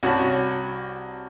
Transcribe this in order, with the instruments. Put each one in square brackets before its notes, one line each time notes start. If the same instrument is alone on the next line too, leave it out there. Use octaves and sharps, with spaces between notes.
[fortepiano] C2 F#4 C#5 A5 B5